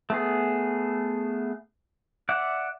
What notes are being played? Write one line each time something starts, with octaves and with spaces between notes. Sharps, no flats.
A3 B3 G#4
D5 E5 F#5